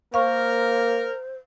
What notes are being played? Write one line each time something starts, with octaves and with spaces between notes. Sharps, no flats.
A#3 A#4 C5 F5 C#6